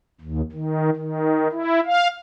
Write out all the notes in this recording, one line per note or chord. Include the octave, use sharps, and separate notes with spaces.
D#2
D#3
D#3
E4
F5